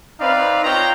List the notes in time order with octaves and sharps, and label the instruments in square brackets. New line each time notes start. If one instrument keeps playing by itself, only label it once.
[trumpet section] C4 D#4 B4 D5 F5
F4 C5 C#5 D#5 G5 A#5